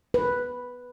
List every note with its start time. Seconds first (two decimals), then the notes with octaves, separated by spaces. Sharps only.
0.14 B4